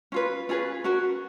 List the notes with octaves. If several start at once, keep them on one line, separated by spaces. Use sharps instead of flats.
C#4 F4 B4
C#4 F4 G#4 B4
C#4 F#4 A#4